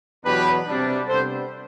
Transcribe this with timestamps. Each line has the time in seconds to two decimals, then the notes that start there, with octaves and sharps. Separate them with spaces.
0.24 E2 B2 F#3 B3 D4 G4 B4
0.67 C3 G3 D4
1.07 C3 G3 B3 D4 A4 C5